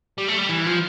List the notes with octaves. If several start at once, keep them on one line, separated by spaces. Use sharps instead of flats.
G3
A3
G3
E3
F3